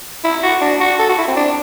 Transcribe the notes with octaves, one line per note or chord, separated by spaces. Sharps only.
E4
F#4
D4
F#4
A4
F#4
E4
C4
D4